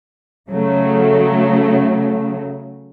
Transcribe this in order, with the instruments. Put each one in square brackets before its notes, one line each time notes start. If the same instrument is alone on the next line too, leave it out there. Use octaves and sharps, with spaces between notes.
[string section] C#3 F#3 A3